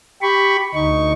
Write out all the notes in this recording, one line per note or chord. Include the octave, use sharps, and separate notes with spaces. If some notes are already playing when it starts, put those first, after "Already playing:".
G4 B5 C#6
D2 D#4 C#6